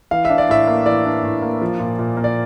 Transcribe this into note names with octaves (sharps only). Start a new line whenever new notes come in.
E3 F5
D4 E5
D5
A2 E5
A#3
E3 D5
D4
A2
A#3
F3
A#2
A#2
A#3
D5